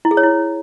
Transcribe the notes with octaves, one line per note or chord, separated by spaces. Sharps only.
E4
G#4
C#5
E4